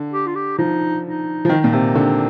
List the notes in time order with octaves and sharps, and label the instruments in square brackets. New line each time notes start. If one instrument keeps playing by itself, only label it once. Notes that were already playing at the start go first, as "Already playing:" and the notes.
Already playing: [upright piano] D3
[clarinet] G4
F4
G4
[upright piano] F3 [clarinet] D#4
[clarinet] D#4
[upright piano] F3
[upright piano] D#3 [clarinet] D#4
[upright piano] A#2
C3
[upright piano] D3 [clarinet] C4